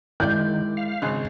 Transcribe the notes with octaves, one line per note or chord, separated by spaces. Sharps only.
D#3 G#3 E4 D5 G6
F5
G#1 C#3 F#6